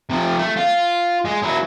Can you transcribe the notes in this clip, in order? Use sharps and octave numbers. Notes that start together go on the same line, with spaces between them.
C3 F3
A3
F4
G#3
F#3 E4